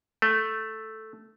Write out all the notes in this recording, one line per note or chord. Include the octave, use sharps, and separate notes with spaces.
A3